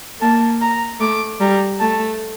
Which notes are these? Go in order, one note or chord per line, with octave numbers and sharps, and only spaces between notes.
A#3 A5
A#5
A3 D6
G3 A#5
A3 A5